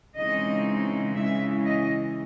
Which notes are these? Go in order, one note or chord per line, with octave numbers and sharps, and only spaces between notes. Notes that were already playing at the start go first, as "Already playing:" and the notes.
C#3 E3 G#3 C4 D#4 D#5
C#3 E3 G#3 E5
D#5